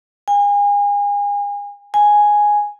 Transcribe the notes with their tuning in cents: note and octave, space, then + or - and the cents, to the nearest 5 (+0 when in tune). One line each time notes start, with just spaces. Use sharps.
G#5 -35
G#5 +0